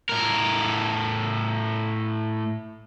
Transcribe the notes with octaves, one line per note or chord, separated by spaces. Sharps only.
A2 A#4